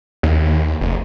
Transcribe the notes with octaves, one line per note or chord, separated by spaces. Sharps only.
D#2
F1